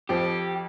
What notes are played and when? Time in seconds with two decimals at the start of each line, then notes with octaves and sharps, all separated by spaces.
0.09 F2 F3 G4